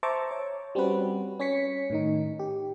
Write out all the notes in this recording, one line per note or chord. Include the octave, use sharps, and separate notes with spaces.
C5 E5 A5 A#5 C#6 D6
C#5
G3 C4 C#4 F#4 B4
C#4 C#5 B6 C#7
A2 D#3 D#4
G4